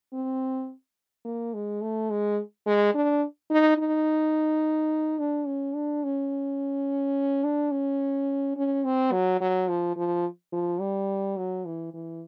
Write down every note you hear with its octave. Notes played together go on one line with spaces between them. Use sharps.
C4
A#3
G#3
A3
G#3
G#3
D4
D#4
D#4
D4
C#4
D4
C#4
D4
C#4
C#4
C4
F#3
F#3
F3
F3
F3
G3
F#3
E3
E3